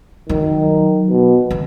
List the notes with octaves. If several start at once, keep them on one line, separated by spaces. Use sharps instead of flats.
D#3 F#3
B2
D#3